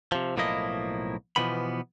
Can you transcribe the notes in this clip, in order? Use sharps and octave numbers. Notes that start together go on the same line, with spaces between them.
C3 F3
B1 A2 F3 A#3 E4 D#5
B2 E3 F3 B3 B5